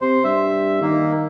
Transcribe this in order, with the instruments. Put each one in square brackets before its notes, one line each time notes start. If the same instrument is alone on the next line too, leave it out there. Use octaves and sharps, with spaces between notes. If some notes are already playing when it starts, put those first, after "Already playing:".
[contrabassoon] C3 [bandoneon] C5
[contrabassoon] G2 [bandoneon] E5
[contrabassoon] D#3 [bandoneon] A#3